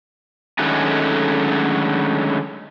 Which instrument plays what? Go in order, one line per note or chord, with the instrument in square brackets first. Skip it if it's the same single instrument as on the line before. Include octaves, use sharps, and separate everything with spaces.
[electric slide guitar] D3 D#3 F#3 G#3 A3 C#4